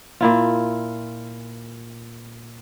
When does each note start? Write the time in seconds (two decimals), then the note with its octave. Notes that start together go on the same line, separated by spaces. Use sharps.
0.21 A#2 E4 F4